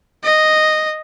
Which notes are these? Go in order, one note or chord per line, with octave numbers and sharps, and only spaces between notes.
D#5